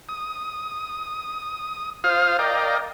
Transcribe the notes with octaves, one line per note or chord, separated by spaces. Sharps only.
D#6
F4 C5 F5 D#6 F6
A#4 D5 D#5 F5 G5